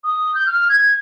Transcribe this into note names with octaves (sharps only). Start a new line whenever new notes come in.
D#6
G6
F6
G#6